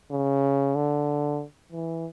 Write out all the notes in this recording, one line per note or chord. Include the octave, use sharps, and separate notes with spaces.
C#3
D3
E3